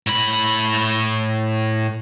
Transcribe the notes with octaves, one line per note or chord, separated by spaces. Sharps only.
A2 B5